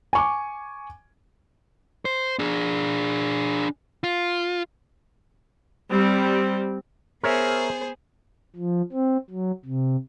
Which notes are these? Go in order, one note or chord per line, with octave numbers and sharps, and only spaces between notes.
G#5 C#6 D6
C5
D4 G#4
F4
G3 C4
B3 G#4 A#4 C5 C#5 E5
F3
C4
F#3
C3